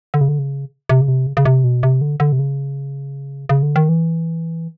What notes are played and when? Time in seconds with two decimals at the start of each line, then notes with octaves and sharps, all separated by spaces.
0.14 D3
0.21 C#3
0.29 D3
0.39 C#3
0.89 C3
1.01 C#3
1.08 C3
1.27 C#3
1.37 C#3
1.45 C3
1.64 B2
1.83 C3
2.01 D3
2.20 D3
2.32 C3
2.39 C#3
3.49 C#3
3.63 D3
3.76 D#3
3.89 E3